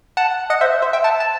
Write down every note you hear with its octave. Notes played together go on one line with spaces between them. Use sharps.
F#5 A5
D#5 F#5
C5 E5
C5 E5
E5 G5
F#5 A5
A5